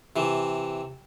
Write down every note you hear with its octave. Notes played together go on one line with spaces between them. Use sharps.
C3 E3